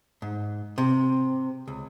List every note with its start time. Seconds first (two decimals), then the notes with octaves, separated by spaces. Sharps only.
0.22 G#2
0.78 C3
1.68 C#2